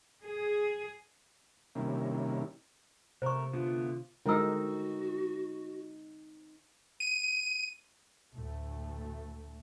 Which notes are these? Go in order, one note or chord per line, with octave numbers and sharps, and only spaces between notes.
G#4
C3 D#3 G3 A#3 C#4 E4
C3 A3 A#4 C5 C#6
D3 A3 B3 F4
D3 G#3 C4 D#4 E4 F#4 A#4 E6
D#7
D2 A2 A3